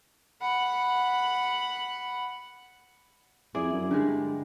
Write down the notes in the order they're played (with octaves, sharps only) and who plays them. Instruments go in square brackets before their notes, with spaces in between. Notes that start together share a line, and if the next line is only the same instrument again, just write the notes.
[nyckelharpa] F#5 B5
[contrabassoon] F2 [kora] E4 G#4 D5
[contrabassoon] F#2
[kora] G2 G3 G#3 [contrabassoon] D3